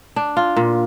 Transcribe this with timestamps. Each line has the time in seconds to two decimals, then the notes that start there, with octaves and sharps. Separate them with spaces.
0.16 D4
0.37 F4
0.56 A#2